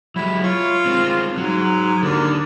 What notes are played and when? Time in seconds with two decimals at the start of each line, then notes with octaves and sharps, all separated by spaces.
0.16 F#3 G#3 E4
0.44 F4 C#5
0.86 G#3 C4
1.38 G#2 F#3
2.03 D#2 D3 D4